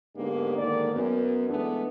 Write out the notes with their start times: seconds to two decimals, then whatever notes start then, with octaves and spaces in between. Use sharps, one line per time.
0.16 G#2 D3 A#3 B3 D4 G4
0.58 G#2 D3 D#3 A#3 D5
0.93 F#2 B3
1.49 E3 G#3 A3 B3 D4